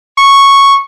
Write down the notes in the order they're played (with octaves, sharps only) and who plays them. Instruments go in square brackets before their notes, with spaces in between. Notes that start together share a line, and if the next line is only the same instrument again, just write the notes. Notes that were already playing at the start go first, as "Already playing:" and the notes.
[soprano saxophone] C#6